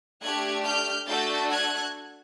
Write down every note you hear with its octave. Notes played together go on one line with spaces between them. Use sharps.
A3 D4 G4 F#6 G#6
F6 G6
A3 D4 F#4 A4 G6 A6
F#6 G#6